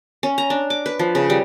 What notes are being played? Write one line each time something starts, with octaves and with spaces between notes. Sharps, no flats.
C#4
A#5
D4
D6
B4
F3
C#3
G3